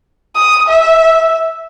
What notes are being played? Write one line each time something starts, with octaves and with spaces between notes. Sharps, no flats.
D#6
E5